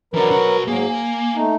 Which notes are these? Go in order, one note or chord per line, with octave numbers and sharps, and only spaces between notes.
E3 F#3 D4 A#4 B4
B1 F#4
G#2 F#3 A#3 G#4
G#5
A3 D#4